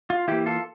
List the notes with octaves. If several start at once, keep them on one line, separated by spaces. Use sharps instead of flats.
F4
E3 A#3 E4 G4
F4 A4